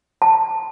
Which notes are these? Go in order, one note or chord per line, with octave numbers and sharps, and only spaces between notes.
A5